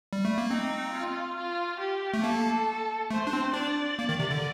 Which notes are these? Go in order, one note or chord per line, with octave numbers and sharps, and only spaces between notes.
G3
A3
A#3
C4 D#4
F4
F4
G4
A3
A#3 A4
A3 C5
D4
C4
D4 D5
A#3
D#3
C3
D3